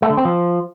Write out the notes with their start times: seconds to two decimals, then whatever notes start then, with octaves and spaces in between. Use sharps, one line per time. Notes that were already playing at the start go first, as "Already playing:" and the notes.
0.02 A3
0.10 D3
0.17 C4
0.25 F3